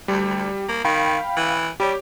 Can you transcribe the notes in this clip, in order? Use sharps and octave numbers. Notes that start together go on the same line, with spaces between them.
D2 G3
A#3
D#3 F5 G5 B5
E3
G3 G4 C#5